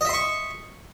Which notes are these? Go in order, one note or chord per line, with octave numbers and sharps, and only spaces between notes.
D#5 E5 C6 C#6